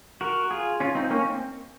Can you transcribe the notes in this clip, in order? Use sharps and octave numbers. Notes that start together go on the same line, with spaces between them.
F#4 A#4
F4 G#4
C#4 F4
C4 D#4
A#3 C#4
C4